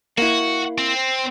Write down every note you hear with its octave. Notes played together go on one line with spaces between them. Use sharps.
A#3 E4 F#4
C4